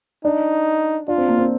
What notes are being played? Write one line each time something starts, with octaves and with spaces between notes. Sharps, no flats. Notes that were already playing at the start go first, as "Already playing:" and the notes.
D4 D#4
D4 F4
C4
A#3
C4